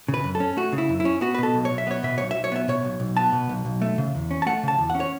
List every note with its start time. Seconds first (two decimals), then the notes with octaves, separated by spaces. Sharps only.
0.08 C#3
0.14 B4
0.24 F#2
0.35 A4
0.40 C#4
0.57 A3 F#4
0.72 C#3
0.78 E4
0.89 F#2
1.00 E4
1.05 C#4
1.21 B3 F#4
1.35 B4
1.38 B2 A4
1.54 B1
1.65 C#5
1.71 B1
1.78 E5
1.87 B3 C#5
2.03 B2 E5
2.18 B1 C#5
2.31 B1 E5
2.44 C#5
2.52 B3 E5
2.68 B2 C#5
2.85 B1
3.00 B1
3.17 B3 A5
3.32 B2
3.49 B1
3.65 B1
3.82 A3
3.98 C#3
4.15 E2
4.31 C#4
4.42 A5
4.46 A3 F#5
4.63 C#3 A5
4.78 E2
4.90 C#4 F#5
5.00 C#5